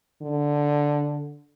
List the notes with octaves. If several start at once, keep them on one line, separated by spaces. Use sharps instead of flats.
D3